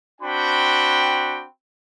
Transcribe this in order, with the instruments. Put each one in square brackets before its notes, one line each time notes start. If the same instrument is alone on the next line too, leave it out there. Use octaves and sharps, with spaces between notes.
[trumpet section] C4 D4 F#4 G5 B5